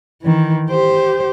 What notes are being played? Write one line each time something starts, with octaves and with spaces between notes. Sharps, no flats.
D#3 E3
G4 C5